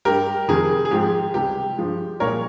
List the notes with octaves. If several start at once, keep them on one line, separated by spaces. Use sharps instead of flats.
G2 G3 G4 A#4
F2 C3 D#3 G#3 G#4
G#4
G#2 F3 G#3 G4
C#2 C3 G3 G4
G2 F3 G#3
C2 A#2 F3 G#3 A#4 C#5